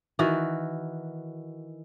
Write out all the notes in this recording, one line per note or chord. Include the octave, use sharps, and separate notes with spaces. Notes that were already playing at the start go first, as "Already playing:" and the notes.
D#3 E3 F#4